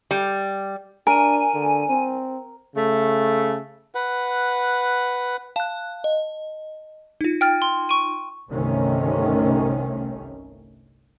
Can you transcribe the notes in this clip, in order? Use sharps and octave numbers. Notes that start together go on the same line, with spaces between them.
G3
D4 A#4 G#5
D3
C4
C#3 A3
B4 F#5
F5 A5 F#6
D#5
D#4 F4
G5 F6 A6
C6
C#6 D7 D#7
G1 C2 C3 D#3 A3 C#4